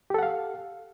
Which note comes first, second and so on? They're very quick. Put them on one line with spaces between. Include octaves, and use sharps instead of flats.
G4 A4 F#5 F5